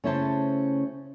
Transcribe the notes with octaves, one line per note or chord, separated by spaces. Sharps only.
C#3 A3 C#4 E4 C5 A5